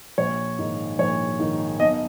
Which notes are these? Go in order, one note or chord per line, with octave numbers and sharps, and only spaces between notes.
A#1 C#5
G#2 D#3
A#1 C#5
G#2 D#3
B1 D#5